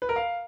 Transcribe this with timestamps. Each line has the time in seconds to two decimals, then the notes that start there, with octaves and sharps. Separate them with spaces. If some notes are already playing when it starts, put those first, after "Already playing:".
0.02 B4
0.09 A#4
0.16 F5